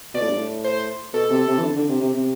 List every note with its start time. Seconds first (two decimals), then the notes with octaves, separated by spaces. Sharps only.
0.14 B2 D5
0.21 A2
0.29 G2
0.37 A2
0.64 C5
1.13 B2 A4
1.30 C3
1.47 C3
1.58 E3
1.63 D3
1.76 D3
1.89 C3
2.00 C3
2.13 C3